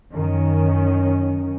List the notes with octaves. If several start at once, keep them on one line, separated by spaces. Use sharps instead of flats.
F#2 D#3 C#4